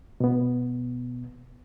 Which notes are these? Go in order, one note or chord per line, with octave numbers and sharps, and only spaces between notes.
B2 B3